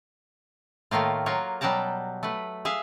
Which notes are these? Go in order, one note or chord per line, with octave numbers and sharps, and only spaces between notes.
A2 D#3 A3 A#3 F4
F#3 A#3 F4 C#5
B2 F#3 G3 G5 A5 A#5
A3 B4
G#4 E5 F5